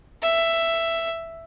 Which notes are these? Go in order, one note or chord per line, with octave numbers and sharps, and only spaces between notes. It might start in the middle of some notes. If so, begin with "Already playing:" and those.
E5